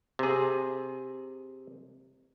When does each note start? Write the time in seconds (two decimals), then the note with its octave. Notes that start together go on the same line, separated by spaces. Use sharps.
0.19 C3 G#4